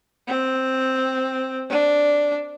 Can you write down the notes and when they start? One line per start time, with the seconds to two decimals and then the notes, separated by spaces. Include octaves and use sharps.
0.28 C4
1.70 D4